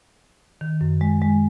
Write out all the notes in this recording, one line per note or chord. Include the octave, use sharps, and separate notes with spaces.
D#3
F#2
G#3
G#3